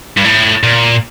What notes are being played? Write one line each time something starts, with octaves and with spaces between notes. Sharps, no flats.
G2
A2
A#2